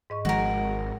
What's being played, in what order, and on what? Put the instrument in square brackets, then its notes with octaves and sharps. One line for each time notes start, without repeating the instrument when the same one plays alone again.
[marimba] G#2 D#5 C#6
[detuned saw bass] G#1 [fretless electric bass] D#3 F3 G#3 [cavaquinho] F#4 A#4